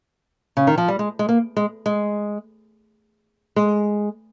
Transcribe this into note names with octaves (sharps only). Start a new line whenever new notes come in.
C#3
D#3
F3
G3
G#3
G#3
A#3
G#3
G#3
G#3